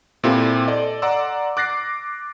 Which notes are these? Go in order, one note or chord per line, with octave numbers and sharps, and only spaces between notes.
A#2 C4 E4 F4 G4 A4
A4 D5 D#5
D5 F#5 A#5 C6 D6 E6
D6 F#6 A6 A#6 C7